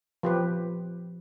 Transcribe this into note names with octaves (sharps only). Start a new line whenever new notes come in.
F3 G4 B4